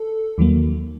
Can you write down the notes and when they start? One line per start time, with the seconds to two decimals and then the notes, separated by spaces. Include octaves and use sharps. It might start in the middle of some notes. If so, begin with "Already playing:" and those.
Already playing: A4
0.38 D#2 D#3 F#3 A#3